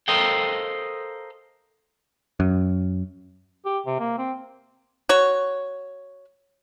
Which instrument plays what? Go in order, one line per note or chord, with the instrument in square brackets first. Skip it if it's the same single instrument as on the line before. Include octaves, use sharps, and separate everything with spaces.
[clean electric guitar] A4 A#4 C5 D#5 F5 G5
[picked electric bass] F#2
[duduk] G4
C3
A#3
C4
[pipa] F#4 C#5